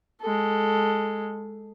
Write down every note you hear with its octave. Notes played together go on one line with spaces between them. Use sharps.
G#3 A4